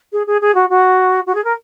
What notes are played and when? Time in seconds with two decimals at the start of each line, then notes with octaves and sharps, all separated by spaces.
0.12 G#4
0.27 G#4
0.41 G#4
0.55 F#4
0.69 F#4
1.26 F#4
1.35 G#4
1.44 A#4